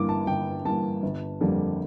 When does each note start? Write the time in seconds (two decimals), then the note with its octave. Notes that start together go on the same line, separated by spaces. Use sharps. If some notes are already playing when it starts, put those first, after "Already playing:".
Already playing: G1 G2 E3 A#3 D6
0.09 A5
0.27 G1 G5
0.65 G2 E3 A#3 A5
1.03 G1
1.41 F2 D3 G3 A#3